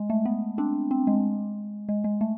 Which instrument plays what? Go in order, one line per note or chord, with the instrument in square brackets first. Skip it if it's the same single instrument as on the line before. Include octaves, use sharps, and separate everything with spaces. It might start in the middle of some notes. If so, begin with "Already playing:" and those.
Already playing: [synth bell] G#3
A3
B3
C4 D4
C4
G#3
G#3
G#3
A3